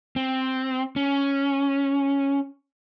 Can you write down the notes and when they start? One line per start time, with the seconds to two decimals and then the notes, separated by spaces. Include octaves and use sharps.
0.16 C4
0.96 C#4